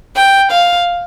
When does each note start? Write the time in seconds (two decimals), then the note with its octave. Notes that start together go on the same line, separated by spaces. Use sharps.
0.16 G5
0.51 F5